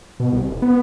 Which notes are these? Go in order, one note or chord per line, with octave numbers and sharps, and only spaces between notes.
B2
C2
E1
B3